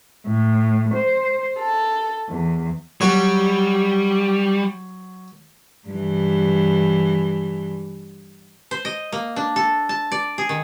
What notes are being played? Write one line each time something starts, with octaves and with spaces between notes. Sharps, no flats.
A2
C5
A4
E2
F#3 G3 F#4
G2 E3
C5
D#5
A#3
D4
A4
A5
D5
G#4
D#3